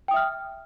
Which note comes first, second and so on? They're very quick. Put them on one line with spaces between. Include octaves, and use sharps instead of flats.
G5 D#6 E5 F6